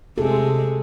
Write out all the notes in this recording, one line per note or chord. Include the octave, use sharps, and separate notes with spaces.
C3 G#3 G#4 A4